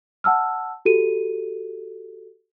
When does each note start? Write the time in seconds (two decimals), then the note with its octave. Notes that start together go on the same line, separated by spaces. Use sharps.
0.24 F#5 A5 E6 F6
0.85 F#4 G4 A4 D#7